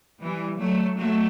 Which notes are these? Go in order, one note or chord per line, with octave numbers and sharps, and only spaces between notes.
E3 G3
F#3 A3
F#3 A3